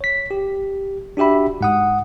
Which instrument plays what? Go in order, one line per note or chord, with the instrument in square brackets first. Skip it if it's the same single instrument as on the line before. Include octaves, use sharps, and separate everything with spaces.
[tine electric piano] C#5 B6
G4
D4 F#4 G4 E5 B5
G#2 F#5 D#6